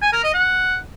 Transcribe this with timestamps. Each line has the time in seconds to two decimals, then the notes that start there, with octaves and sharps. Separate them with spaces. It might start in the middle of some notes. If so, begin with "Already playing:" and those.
0.02 G#5
0.13 A#4
0.24 D#5
0.34 F#5